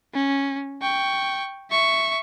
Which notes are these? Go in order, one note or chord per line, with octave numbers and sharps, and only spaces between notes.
C#4
G5 C#6
E5 C#6